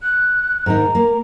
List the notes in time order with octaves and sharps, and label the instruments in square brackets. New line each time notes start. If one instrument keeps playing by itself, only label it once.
[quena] F#6
[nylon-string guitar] G#2 D#3 D#4 [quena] A#5
[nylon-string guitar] A#3